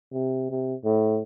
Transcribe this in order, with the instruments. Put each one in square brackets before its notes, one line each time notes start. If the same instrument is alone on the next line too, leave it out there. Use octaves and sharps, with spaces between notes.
[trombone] C3
C3
A2